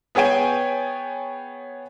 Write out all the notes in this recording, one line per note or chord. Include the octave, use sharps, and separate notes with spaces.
B3 G#4 C#5 G5 G#5